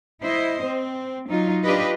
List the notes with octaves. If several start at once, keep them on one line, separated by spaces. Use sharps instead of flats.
E4 C5 D#5
C4
F#3 D#4 F4
D4 F4 G4 B4 D#5